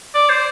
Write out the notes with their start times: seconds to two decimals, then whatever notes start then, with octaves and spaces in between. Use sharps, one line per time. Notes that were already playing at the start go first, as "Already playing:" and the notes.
0.15 D5
0.30 C5